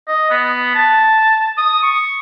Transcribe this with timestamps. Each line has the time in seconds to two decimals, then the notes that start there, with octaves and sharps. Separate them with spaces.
0.08 D#5
0.31 B3
0.75 A5
1.57 D#6
1.83 C#6